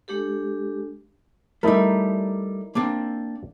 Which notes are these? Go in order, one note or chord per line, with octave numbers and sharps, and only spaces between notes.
G#3 D4 G4 A4
G3 A3 D#4 E4 A#4
A#3 C4 D4